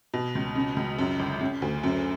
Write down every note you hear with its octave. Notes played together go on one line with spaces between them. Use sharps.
B2
C#2
C#3
C#2
F#2
G1
C#3
D2
F#2